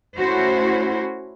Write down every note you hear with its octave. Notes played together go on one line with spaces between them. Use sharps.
A3 C#4 E4 F#4 C5